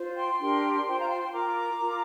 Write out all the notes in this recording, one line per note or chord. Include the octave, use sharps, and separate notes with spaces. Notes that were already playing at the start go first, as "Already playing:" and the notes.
Already playing: F4 C5
G5 C6
D4 G4 A#4 G5 C6
F4 C5 G5 C6
F5 A#5
G5 C6
G5 C6
F4 A#4 A#5 D6
F4 A#4